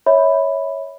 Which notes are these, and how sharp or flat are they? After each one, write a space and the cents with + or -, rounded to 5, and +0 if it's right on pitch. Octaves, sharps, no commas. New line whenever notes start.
C#5 +0 E5 -30 B5 +5